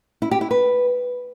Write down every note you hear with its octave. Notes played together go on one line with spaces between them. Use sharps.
E4
G4
E4
B4